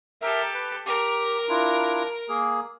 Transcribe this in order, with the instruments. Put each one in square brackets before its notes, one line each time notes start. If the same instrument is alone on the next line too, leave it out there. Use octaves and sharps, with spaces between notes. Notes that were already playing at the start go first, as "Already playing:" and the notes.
[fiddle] G4 A4 [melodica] A#4 E5
[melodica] B4
[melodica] G4 [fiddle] A#4
[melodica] D4 E4 F4
A#3 G#4